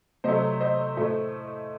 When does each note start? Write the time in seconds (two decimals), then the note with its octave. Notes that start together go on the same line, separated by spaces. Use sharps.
0.24 C3 F#3 A3 C5 D#5
0.60 C5 D#5
0.97 A2 A3